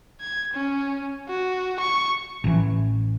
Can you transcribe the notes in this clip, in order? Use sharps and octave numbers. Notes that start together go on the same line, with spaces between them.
G#6
C#4
F#4
C#6
A1 E3